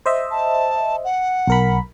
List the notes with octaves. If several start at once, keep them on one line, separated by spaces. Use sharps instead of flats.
C5 D#5 E5
A5
F#5
B1 A#4 B5